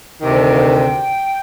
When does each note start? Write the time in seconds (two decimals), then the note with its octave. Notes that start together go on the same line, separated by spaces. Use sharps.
0.21 D2 C3 D#3 G5
0.38 A5
0.43 G5
0.55 F5
0.60 G5